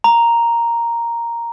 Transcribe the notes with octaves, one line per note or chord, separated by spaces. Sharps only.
A#5